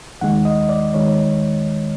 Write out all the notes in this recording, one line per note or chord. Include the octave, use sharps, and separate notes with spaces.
D#2 D#3 G#3 F#5
D#5
D5
D#3 G#3 C#5